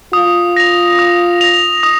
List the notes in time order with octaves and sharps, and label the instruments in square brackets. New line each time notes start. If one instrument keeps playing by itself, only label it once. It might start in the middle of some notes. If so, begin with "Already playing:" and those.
[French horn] F4 [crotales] D#6
[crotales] A#6 F7
D#6
A#6 F7
D#6